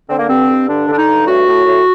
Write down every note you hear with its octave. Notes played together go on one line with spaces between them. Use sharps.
D3 C4
A#3
G2 C4
G2
D3 D4
D3 D4
D#4
G2
A2 F#4
A2
A2